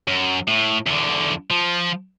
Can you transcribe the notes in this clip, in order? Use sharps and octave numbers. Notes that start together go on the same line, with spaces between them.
F#2
A2
E2 D3
F3